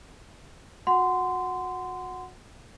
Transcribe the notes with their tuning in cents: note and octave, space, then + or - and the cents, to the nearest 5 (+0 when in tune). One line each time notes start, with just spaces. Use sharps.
F#4 -30 F#5 +0 C6 -20